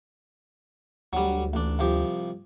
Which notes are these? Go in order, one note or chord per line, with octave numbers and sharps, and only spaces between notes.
D2 F#3 G3
A1 D4
C2 F3 G4